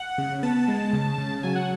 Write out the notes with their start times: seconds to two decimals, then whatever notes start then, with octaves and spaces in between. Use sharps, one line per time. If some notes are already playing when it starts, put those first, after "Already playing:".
Already playing: F#5
0.18 C#3
0.43 B3 A5
0.68 G#3
0.93 C#3
1.18 C#3
1.43 F#3 G#5
1.56 F#5